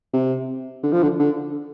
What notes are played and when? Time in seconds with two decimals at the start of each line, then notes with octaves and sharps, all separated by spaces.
0.14 C3
0.83 D3
0.92 F3
1.03 D3
1.20 D3